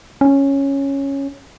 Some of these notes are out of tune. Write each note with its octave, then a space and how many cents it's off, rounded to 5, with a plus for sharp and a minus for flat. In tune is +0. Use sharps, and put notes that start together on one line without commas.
C#4 -5